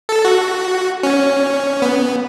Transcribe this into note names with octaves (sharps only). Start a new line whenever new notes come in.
A4
F#4
C#4
B3